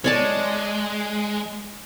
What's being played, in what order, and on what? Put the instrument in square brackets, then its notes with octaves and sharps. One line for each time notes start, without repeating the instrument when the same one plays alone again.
[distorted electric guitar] G#3 [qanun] C#5 D5 A5